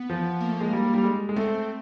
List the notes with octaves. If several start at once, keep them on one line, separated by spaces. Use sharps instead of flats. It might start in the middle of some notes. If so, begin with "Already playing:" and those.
Already playing: B3
F3
A#3
A3
G#3 A#3
G3
G3
G#3
G#3
A3 C4